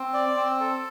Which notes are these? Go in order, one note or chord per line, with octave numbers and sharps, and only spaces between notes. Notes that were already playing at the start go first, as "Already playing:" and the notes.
Already playing: C4
D5
C4
A4